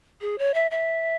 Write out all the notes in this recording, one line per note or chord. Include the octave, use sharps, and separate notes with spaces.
G#4
C#5
E5
E5